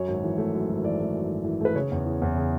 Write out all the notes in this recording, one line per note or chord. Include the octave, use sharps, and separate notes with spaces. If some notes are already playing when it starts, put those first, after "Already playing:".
Already playing: F#2 C#5
G#1
E3
A3
F#2
G#1
E3 D5
A3
F#2
G#1
E3
A3 B4
C#3 C#5
E2
E3
E2
C#3